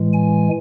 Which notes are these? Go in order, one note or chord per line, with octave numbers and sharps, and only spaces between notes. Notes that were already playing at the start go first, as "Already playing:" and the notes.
Already playing: A2 E3 G#3
G#5